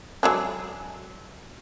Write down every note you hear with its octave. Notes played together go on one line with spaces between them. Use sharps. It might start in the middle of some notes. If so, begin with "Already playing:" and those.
F#3 G#3 D4